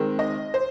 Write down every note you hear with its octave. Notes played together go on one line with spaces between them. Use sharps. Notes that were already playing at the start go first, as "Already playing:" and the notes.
Already playing: D#3 G#3 C4
D#5
C5